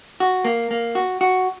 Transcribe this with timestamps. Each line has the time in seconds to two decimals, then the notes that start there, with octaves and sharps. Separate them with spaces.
0.20 F#4
0.45 A#3
0.71 A#3
0.95 F#4
1.21 F#4